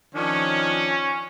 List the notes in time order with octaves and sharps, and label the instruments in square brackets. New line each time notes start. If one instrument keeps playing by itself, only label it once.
[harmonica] D#3 F3 D4 [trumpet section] C#4